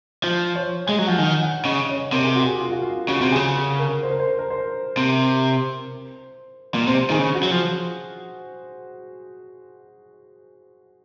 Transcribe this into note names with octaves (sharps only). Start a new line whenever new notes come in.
F3 F5
C#5
G#3 G#5
F#3
F3 F#5
D#3 G#5
F#5
C#3 D#5
C#5
C3 A#4
G#4
F#4
G#4
F4
F#4
F4
C#3 F#4
C3
C#3 G#4
G#4
A#4
C5
A#4
C5
A#4
C5
C3
A#2
C3 C5
D#3 G#4
C#3
F#4
F#3
F3